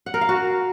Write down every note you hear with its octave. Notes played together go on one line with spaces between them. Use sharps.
F#5
A#4
F5
F#4